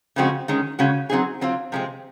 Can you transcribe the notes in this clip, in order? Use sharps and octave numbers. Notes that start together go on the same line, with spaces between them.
C#3 F3 G#3 C4 F#4
D#3 G#3 C#4
C#3 G#3 C#4 F#4
F#3 C4 D#4 G#4
F#3 C4 F4
C3 F3 G#3 C4